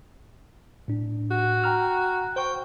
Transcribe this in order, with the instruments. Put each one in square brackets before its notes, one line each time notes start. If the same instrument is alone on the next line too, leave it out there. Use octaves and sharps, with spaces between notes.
[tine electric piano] A2 D4
[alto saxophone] F#4
[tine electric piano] G5 A#5 F6
[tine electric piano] C5 C#6 [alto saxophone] G5